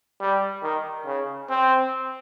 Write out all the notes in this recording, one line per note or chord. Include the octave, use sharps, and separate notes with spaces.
G3
D#3
C#3
C4